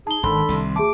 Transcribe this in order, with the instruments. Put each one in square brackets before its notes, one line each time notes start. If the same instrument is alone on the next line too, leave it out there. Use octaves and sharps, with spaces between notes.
[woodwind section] D#4 G#4 [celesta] A5 G7
[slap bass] G#1 [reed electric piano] D#3 C6 [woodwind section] D4 A4 B5
[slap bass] C2 C3
[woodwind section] D2 A3 D6 [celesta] G#4 A5